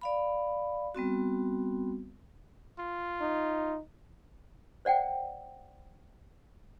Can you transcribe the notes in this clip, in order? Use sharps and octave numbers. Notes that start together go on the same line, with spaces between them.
D5 F5 B5
G3 B3 C4 F#4
F4
D#4
C5 D5 F#5 G5